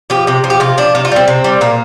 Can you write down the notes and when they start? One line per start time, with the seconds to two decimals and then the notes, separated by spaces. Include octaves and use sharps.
0.10 F3 G4
0.27 C3 G4
0.44 F3
0.50 G4
0.60 C3 F4
0.78 F3 D4
0.95 C3 F4
1.05 F4
1.11 G3 C4
1.27 C3 C4
1.44 G3
1.61 A#2 A#3